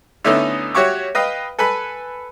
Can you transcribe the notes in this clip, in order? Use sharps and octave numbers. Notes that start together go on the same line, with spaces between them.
D3 A3 B3 C#4 D#4 E4
F#4 G4 C#5 E5 C#6 D6
B4 D#5 F5 G5
A4 B4 G#5 B5